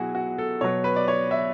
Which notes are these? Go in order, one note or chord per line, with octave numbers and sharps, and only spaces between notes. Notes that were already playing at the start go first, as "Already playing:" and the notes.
Already playing: B2 F#3 E4 F#4 G#4
F#4
A4
B2 F#3 C#5
B4
D5
C#5
E5